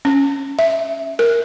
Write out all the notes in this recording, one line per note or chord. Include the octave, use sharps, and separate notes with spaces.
C#4
E5
A#4